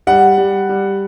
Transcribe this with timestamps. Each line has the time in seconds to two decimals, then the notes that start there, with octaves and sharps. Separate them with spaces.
0.07 G3 F#5
0.38 G3
0.69 G3